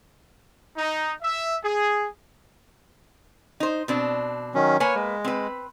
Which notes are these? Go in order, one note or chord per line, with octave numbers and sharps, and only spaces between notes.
D#4
E5
G#4
D#4 C5
B2 C4 D4
D#3 F#3 C#4
A#3 B4 C#5 G#5
G#3
C4 B4